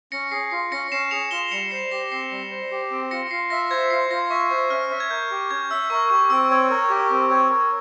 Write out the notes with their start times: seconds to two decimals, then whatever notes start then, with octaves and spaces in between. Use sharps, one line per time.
0.12 C#4 A#6 C#7
0.32 G#4 C7
0.51 F4 C7
0.72 C#4 A#6 C#7
0.92 C#4 C7 E7
1.11 G#4 C#7 F7
1.31 F4 E7 G7
1.52 G3 C#7 F7
1.71 C5 C7
1.91 G4 A#6
2.12 C4 C7
2.31 G3
2.51 C5
2.71 G4
2.91 C4
3.11 F4 A#6 C#7
3.31 F4 C7
3.50 E5 A#6
3.71 C5 G#6
3.90 F4 C7
4.11 F4 A#6
4.30 E5 C#6
4.51 C5
4.70 C#4 F6
4.91 E5
5.00 G#6
5.11 A#4 G6
5.31 G4
5.51 C#4 G#6
5.71 E5 E6
5.90 A#4 C#6
6.10 G4 C#6
6.30 C4 E6
6.51 C#5
6.70 A#4
6.90 G4
7.10 C4
7.30 C#5
7.50 A#4